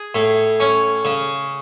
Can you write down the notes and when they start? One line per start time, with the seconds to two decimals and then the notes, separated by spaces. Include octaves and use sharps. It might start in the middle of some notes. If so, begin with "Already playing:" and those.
Already playing: G#4
0.15 A2
0.60 C#4
1.05 C#3